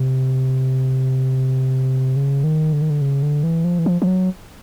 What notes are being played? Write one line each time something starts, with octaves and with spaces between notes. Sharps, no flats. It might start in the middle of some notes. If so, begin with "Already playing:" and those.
Already playing: C3
C#3
D#3
D3
D#3
D3
C#3
D3
E3
F3
E3
F3
F3
F#3